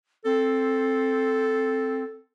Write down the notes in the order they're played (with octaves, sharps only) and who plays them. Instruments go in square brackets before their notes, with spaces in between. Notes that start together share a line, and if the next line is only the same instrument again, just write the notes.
[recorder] C4 [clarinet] A4